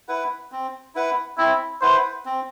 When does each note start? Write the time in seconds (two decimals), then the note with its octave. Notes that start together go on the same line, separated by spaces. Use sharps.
0.08 E4 B4 F#5
0.52 C4
0.95 E4 B4 F#5
1.38 C4 E4
1.81 E4 B4 C5 F#5
2.25 C4